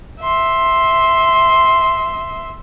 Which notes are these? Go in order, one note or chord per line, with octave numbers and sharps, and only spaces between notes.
E5 C6